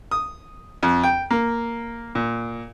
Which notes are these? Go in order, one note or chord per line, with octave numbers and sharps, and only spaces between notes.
D#6
F2
G5
A#3
A#2